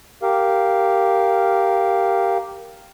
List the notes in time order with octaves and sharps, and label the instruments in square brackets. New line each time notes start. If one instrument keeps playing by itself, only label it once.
[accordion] G4 A#4 F5